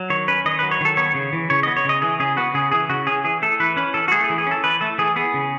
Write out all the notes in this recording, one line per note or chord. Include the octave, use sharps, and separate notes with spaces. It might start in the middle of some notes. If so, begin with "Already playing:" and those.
Already playing: F#3
D#3 C#5
C#4 B4
D#3 D#5
F#3 B4
C#5
D#3 A4
B3 C#5
C#3
E3
C#3 C#5
B3 D#5
C#5
C#3 D#5
E3 G#4
C#3 G#4
B3 F#4
C#3 G#4
E3 G#4
C#3 F#4
C#4 G#4
E3 G#4
A3 A4
E3 B4
C#4 B4
E3 A4
F#4
A3 G#4
G#4
E3
G#4
C#4
A4
E3 B4
A3 A4
E3 G#4
B3 G#4
C#3